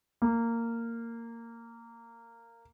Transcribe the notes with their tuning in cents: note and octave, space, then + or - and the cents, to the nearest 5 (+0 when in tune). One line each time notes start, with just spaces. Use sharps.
A#3 -15